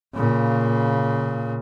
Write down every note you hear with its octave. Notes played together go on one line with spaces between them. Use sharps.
A#2 C#3